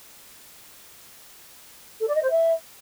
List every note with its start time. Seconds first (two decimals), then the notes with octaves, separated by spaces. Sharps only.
2.00 A4
2.07 D5
2.15 D#5
2.22 C5
2.29 E5